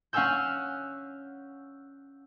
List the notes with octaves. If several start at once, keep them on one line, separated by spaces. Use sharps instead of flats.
C#4 F5 F#5 G#5 E6 G6